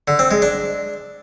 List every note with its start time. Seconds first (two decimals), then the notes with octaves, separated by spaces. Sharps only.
0.08 D3
0.19 C4
0.31 G#3
0.42 D4